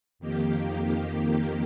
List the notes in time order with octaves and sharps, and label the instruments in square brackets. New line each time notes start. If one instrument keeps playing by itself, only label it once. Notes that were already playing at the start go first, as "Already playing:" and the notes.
[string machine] F2 D#3 A#3 G4